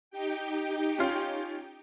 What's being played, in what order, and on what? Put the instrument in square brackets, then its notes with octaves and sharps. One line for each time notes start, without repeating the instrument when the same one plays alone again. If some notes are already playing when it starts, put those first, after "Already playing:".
[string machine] D#4 G4 G5
[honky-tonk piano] C#4 F4